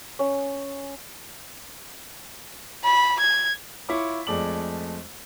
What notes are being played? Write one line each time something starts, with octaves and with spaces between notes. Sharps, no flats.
C#4
B5
G#6
E4 F4 C#5 C#6 D6
F2 G#3 A3 D5 D6 F#7